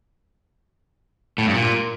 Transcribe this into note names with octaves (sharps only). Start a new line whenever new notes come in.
A2
G2
A#2